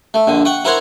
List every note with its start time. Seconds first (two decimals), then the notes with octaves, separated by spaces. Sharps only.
0.14 A3
0.27 A#1 D3
0.45 F#5 G5 C#6
0.65 E4 A#4 C5 C#5 F#5